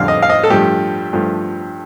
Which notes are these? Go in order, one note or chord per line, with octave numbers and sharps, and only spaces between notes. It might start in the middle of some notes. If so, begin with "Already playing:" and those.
Already playing: F2 D3 G3 F5
D#5
F5
D#5
A4
G2 F3 A3 G4
G2 F3 A3